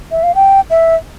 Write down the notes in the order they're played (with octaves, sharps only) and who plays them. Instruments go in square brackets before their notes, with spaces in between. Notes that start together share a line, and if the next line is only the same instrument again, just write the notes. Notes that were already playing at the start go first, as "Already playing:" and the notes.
[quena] E5
F5
G5
E5